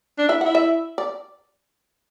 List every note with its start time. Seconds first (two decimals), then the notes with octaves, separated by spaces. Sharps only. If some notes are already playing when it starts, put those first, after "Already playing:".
0.18 D4
0.28 E4 E5
0.41 E4 F#5
0.55 E5
0.98 D5